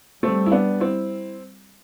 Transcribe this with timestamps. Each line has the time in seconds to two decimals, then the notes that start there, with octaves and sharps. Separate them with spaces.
0.23 G3 A3 C4
0.46 E4
0.52 B3 D4
0.80 C4 E4